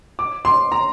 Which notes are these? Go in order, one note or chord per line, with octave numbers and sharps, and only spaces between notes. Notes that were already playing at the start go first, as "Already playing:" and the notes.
D6
C6
A#5